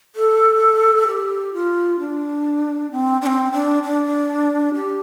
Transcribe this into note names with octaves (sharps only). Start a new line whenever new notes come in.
A4
G4
F4
D4
C4
D4
C4
D4
D4
G4